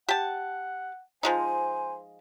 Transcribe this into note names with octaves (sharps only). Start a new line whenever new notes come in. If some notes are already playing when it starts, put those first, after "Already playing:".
G4 F#5 A5
F3 G#3 D#4 C5 G#5